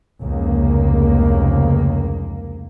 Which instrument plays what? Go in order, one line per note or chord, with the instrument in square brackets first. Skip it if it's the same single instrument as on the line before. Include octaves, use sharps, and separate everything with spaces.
[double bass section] F1 C#2 A#3